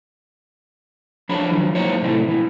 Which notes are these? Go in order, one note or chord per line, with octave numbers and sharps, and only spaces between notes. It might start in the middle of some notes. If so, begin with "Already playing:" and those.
F3 D4 C#5 B5
D#3 F3 F#3
E3 F#3 A#3 D#4 C5 C#5
A2 C3 E3 G#3 A3
B2 E3